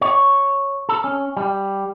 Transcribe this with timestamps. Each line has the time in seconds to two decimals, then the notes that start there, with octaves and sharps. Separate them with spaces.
0.01 C#5
0.89 A4
1.04 C#4
1.37 G3